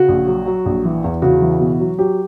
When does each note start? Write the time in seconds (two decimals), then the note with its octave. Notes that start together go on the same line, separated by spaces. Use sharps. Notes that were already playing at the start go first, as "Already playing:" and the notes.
Already playing: C#3 F#4
0.09 A#1
0.27 F#3
0.46 F#3
0.66 A#1
0.85 E3
1.04 E2
1.22 C#3 F#4
1.41 E3
1.60 B2
1.80 F#3
1.98 F#3 G4